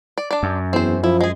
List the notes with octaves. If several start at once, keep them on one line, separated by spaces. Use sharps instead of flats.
D5
D4 D5
F#2
E2 C4 C5
F3 E4
G#3 G#4